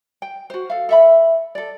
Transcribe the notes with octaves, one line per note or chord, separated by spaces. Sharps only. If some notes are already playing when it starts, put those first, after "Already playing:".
G5
F#4 C5
A4 F5
A4 E5 B5
A4 D5